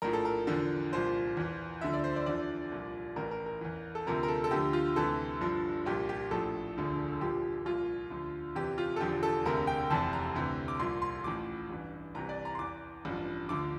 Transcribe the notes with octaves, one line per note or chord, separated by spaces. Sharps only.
A#1 A2 F3 A#4
A4
A#4
E2 D3 F3
C2 A#2 F3 C5
E2 E3
D2 D3 F3 E5
D5
C5
D5
E2 D3 F3 D5
C2 A#2 F3
A1 A2 E3 A#4
A#4
A#4
E2 E3
A4
D2 C3 F3 A#4
A#4
A4
A4
D2 D3 F3 G4
F4
D2 C3 E3 A4
G1 G2 F3
C2 A#2 F3 G4
G4
A#1 A2 F3 A4
E1 D2 D3 F3
C2 A#2 F3 G4
C2 A#2 F3 F4
D2 D3 F3
E2 C3 E3 G4
F4
A4
E1 E2 D3 F3 G4
A4
E1 D2 C3 A#4
G5
F1 E2 C3 A5
A#5
D2 C3 E3
D6
C2 A#2 F3 C6
C6
A1 A2 F3 D6
A1 G2 E3
C2 C3 E3 A#5
D5
A#5
C6
E2 E3 D6
A1 G2 F3
D2 D3 F3 D6